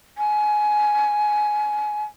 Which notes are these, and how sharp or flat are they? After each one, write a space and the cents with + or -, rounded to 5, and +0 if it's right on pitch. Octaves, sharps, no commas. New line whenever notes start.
G#5 +15